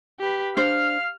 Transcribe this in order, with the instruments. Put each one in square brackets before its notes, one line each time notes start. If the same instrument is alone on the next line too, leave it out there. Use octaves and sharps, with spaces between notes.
[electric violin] G4 B4
[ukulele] D4 C5 [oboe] F5 [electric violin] F6